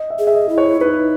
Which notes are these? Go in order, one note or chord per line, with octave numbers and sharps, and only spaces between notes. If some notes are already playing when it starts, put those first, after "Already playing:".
Already playing: D#5
E5
G#4
E5
D#5
E4
C#5
D#4 B4